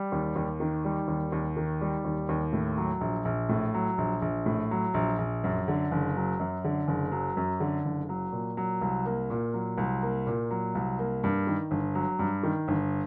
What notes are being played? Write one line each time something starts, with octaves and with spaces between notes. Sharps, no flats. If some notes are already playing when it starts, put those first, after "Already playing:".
Already playing: G3
D#2
D#2
D#3
G3
D#2
D#2
D#3
G3
D#2
D#2
A2
F#3
A#1
A#1
A2
F#3
A#1
A#1
A2
F#3
A#1
A#1
F#2
D3
F#1
F#3
F#2
D3
F#1
F#3
F#2
D3
F#1
F#3
A#2
F#3
C2
A#3
A#2
F#3
C2
A#3
A#2
F#3
C2
A#3
G2
D#3
G1
F#3
G2
D#3
G1